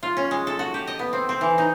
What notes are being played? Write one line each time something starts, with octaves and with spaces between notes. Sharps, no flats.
F4
C#4
G#3
A4
F#4
G4
D#5
B3
C4
C4
E3
D#4